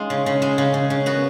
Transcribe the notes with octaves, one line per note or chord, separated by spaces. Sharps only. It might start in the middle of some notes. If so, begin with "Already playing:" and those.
Already playing: G#3 C#4 D#4 F4
C#3
C#3
G#3
C#3
C#3
C#3
B3 F#4